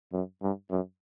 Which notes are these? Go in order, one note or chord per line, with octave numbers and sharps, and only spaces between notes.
F#2
G2
F#2